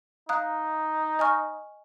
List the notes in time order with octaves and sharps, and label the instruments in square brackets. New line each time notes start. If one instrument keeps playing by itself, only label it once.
[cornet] D#4 [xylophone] F5 A#5 D#6 F#6
[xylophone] D#5 G#5 C#6 F6